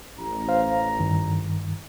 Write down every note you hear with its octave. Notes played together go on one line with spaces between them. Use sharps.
A1 A#5
C5 F5
G2 D#3